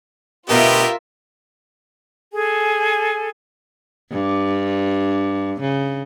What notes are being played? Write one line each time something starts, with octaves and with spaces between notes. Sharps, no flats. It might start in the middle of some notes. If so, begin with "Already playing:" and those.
D2 B2 B3 F4 G4 A#4 E5
G#4 A4 G#5
G2
C#3